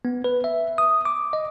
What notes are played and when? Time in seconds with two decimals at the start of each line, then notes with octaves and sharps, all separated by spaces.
0.05 B3
0.24 B4
0.44 E5
0.78 D#6
1.05 D6
1.33 D#5